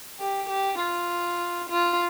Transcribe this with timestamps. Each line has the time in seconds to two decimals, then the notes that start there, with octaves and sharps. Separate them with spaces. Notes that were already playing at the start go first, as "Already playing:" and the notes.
0.20 G4
0.49 G4
0.80 F4
1.70 F4